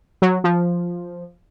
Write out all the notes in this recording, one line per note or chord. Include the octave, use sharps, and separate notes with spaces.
F#3
F3